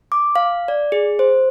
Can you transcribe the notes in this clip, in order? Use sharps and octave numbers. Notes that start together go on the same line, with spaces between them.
D6
F5
D5
G#4
C5